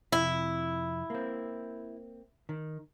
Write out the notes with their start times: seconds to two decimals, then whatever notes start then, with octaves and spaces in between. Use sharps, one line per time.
0.12 F2 C3 E4
1.10 A#3 C4
2.49 D#3